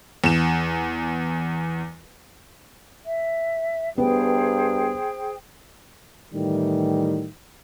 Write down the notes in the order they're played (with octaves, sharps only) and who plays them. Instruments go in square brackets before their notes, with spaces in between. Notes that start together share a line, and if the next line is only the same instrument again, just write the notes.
[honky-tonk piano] E2 E7
[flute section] E5
[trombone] G2 [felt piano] B3 [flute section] G#4 C5 G5
[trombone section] A2 D#3 E3 G3